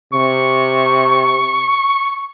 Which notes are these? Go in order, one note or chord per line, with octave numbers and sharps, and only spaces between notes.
C3 C#6